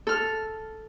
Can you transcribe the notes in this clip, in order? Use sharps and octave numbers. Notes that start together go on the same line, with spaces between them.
A4 F6